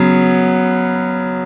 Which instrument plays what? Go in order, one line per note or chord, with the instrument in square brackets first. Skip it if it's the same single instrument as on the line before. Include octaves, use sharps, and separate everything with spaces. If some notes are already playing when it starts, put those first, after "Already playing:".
Already playing: [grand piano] C#3 F#3 B3